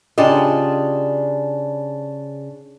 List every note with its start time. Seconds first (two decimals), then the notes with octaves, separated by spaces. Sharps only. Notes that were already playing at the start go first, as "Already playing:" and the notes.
0.18 C#3 D4 F4 G4 D#5